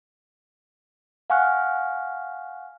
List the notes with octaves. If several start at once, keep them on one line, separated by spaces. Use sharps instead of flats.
F5 F#5 G#5 C#6 F6 F#6